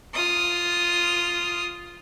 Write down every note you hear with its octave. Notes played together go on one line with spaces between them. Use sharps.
F4 D#6